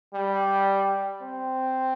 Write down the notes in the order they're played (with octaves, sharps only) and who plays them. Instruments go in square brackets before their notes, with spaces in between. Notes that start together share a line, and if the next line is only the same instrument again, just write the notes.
[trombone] G3
C4